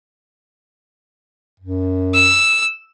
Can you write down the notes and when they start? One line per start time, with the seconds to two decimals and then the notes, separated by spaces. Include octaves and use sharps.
1.60 F#2
2.14 E6